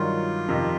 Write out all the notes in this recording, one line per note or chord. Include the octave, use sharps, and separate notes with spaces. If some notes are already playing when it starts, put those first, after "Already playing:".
Already playing: G2 D#3 F#3 F4
F2 C3 D#3